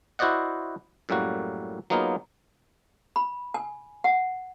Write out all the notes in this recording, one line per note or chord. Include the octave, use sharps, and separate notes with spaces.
E4 F#4 C5 D5 D#5 F#5
F#2 A2 G3 A#3 F#4
F#3 A#3 B3 D#4 F4 G#4
B5
G#5
F#5